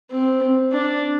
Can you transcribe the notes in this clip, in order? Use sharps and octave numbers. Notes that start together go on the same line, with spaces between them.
C4
D4